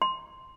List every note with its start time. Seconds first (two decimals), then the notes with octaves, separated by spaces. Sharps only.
0.02 C6